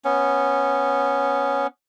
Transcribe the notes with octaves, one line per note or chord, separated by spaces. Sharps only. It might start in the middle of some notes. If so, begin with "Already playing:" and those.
B3 C#4